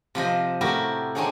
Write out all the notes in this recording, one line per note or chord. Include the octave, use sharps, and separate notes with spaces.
C3 F3 C5 D#5
A2 E4 F#4 G4 A#4
C4 D4 D#4 G#4 C#5 F#5